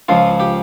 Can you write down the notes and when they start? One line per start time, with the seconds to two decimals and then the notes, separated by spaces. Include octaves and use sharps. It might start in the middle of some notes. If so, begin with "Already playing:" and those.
0.09 C#2 C#3 F3 F4
0.40 G4